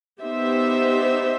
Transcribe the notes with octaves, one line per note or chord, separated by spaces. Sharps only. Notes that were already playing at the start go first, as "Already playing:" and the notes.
B3 D#4 G4 C5 E5